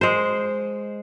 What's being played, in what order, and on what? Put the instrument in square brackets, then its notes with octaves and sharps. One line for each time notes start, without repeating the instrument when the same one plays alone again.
[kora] G#3 C5